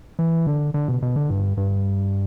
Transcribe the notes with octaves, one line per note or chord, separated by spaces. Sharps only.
E3
D3
D3
B2
B2
D3
G2
G2